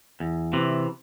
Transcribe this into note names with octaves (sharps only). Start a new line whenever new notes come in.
E2
C3 E3